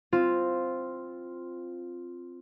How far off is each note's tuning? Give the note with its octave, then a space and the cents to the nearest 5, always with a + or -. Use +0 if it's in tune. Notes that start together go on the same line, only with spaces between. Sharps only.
C4 +0 F4 +0